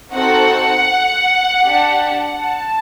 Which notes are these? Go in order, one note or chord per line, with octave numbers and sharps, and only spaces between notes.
C4 D#4 F#4 A4 F#5
D4 G4
A5